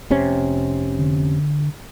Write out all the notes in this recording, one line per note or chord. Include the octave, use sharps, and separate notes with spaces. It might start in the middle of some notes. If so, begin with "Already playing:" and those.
F1 C3 C#4
D3